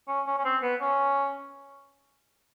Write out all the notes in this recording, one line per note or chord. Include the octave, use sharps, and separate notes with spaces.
C#4
C#4
C#4
C4
B3
C#4